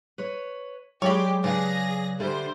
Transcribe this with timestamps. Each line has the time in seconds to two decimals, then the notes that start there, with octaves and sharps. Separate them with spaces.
0.18 B4 C#5
1.02 F#3 G#3 G4 C#5 D5 B5
1.44 C#3 D4 G#4 B4 F5 A#6
2.20 D3 G3 A4 C5 E5